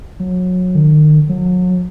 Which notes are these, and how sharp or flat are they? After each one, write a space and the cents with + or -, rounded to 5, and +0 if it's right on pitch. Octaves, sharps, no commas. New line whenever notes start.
F#3 -25
D#3 -40
F#3 -35